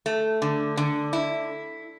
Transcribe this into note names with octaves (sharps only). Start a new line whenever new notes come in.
A3
D3
D3
E4